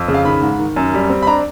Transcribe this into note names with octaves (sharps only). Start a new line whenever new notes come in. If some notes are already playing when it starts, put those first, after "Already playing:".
Already playing: F2
C#3
F5
D#3 B5
G#2
D#3
F#2
G3
C4
B5
D4 A#5